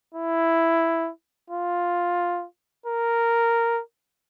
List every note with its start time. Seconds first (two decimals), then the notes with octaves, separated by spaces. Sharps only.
0.15 E4
1.50 F4
2.86 A#4